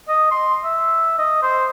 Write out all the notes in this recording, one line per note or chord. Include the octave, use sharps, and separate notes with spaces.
D#5
C6
E5
D#5
C5